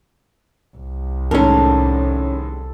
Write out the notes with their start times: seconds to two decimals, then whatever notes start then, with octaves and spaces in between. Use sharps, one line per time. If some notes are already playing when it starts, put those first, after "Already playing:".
0.77 C2
1.31 A2 D#3 G#3 C#4 A4 A#4